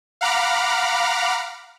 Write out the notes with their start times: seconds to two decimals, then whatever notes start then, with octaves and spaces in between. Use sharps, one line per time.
0.21 F5 F#5 A#5 B5 D6 F6